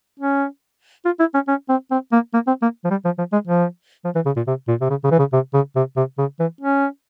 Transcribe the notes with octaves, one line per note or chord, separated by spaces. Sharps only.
C#4
F4
E4
C#4
C#4
C4
C4
A#3
A#3
C4
A#3
F3
G3
F3
F3
G#3
F3
F3
E3
C#3
A#2
C3
A#2
C3
C#3
C#3
E3
C#3
C3
C#3
C3
C3
C#3
E3
C#4